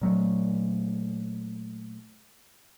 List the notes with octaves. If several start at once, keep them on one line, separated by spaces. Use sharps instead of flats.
A#2 F#3 A3